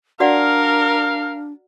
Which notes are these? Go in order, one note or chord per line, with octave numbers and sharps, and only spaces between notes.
D4 F#4 A#4 D5 F5 F#5